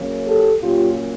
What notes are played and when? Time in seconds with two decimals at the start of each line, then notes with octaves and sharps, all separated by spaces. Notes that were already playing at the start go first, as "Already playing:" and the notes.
Already playing: C#3 F#3 A#3 C#4
0.26 G4 A4
0.61 A#2 F#3 A#3 C#4 F4 G4